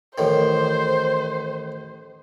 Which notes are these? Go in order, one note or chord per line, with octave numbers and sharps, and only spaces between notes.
A1 A2 D#3 C5